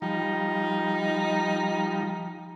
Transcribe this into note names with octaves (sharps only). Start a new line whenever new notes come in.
F3 G3 D#4